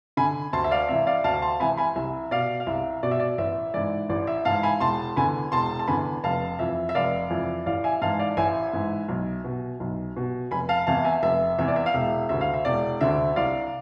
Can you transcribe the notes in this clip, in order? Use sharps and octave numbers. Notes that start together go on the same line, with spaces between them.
D3 G#5 B5
D2 A5 C6
E5
D5 F5
C3 E3 E5
D5 F5
D2 F5 A5
A5 C6
C3 E3 G#5 B5
G#5 B5
C2 E5
B2 D5 F5
F5
C2 E5
B2 D5
E5
D5
A1 E5
G#2 E3 D5
A1 D5
E5
G#2 E3 F5 A5
G#5 B5
E1 A5 C6
E2 D3 G#5 B5
E1 A5 C6
A5
E2 D3 G#5 B5
F1 F5 A5
F2 E3 E5
E5
F1 D5 F5
F2 E3
A1 D5 F5
E5 G#5
G#2 E3 F5 A5
D5 F5
A1 E5 G#5
G#2 E3
B1
B2
B1
B2
F1 G#5 B5
F5 A5
E2 C3 E3 F5 A5
E5 G#5
F1 E5
E2 C3 E3 E5
D5
E5
F5
E1 E5
D2 D3 E5
F5
E5
E1 D5
D2 D3 E5
C2 D5 F5